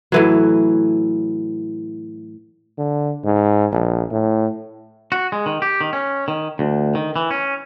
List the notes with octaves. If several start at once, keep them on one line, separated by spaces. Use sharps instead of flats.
A2 E3 F#3
D3
G#2
A#1
A2
F#4
G#3
D#3
G4
D#3
C#4
D#3
D2
D#3
E3
C#4